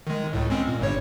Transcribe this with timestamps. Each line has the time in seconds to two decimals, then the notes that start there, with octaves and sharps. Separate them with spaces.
0.07 D#3 G#3
0.33 C#2 A2
0.50 G#3 C4 C#4
0.68 A#2
0.81 G1 G2 C#5